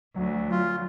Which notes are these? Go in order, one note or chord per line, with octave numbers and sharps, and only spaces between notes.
D2 F#3
F4